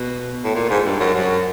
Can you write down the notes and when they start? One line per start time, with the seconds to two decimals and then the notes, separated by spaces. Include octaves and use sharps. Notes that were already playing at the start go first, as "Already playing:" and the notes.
Already playing: B2
0.44 A2
0.55 A#2
0.70 G#2
0.85 G2
1.00 F#2
1.15 F#2